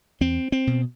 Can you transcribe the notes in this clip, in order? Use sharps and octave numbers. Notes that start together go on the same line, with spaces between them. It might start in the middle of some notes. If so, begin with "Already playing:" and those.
E2 C4
C4
B2